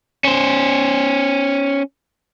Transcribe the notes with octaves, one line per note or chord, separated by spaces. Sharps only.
C#4 C5